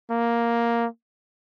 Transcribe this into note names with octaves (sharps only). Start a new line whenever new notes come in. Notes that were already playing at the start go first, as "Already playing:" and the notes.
A#3